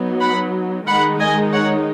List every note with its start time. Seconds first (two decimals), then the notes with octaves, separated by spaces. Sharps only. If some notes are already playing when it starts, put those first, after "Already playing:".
Already playing: F#3 B3 D#4
0.21 F#5 B5
0.87 D#3 G#3 D#4 F#5 B5
1.20 D#5 G#5
1.52 C#5 F#5